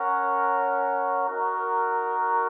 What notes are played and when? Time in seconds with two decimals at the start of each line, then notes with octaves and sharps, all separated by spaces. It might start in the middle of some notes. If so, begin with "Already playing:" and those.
Already playing: C#4 A#4 C#5 F#5
1.28 D#4 F#4 A#4